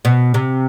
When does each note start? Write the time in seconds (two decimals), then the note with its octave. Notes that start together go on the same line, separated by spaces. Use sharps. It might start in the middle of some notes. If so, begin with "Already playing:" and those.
0.05 B2
0.34 C3